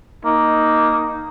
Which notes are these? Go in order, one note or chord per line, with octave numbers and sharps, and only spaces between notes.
A#3 D#4